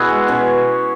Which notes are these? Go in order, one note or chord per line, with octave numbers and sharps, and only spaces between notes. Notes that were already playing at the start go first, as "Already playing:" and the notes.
Already playing: B2 E4 F#4 G#4 B4
G#3
B2 C#4